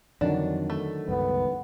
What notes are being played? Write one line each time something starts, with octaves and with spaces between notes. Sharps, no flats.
F2 D3 D#3 F#3 D4
A3
C#2 G2 B3